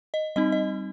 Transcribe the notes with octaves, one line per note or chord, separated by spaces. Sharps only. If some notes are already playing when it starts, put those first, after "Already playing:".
D#5
G3 C4 D#4 D#5
D#5